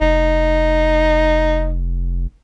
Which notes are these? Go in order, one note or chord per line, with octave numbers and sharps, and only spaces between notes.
F1 D#4